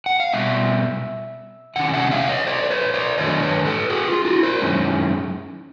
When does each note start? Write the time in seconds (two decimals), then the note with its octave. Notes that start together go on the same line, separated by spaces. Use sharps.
0.06 F#5
0.20 F5
0.32 B2 G3 E5
1.76 C3 D#3 C#4 F#5
1.93 E5 F#5
2.11 D#5 F5
2.29 C#5 D#5
2.47 C5 D5
2.63 C5
2.70 B4 C#5
2.94 C5 D5
3.18 D#3 F#3 A3 D4 C#5 D#5
3.42 B4 C#5
3.65 A4 B4
3.90 F#4 G#4
4.08 F4
4.25 E4 F#4
4.43 A#4 C5
4.61 F#2 D#3 G#3 C#4 E4